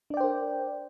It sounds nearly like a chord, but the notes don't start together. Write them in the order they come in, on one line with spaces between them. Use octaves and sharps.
D4 D5 G5 C5 A#4